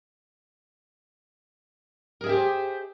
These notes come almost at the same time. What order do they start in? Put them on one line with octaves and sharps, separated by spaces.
A#4 G#4 E5 G4 C5